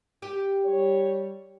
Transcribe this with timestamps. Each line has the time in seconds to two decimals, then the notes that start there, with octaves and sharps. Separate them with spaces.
0.22 G4
0.65 G3 C#5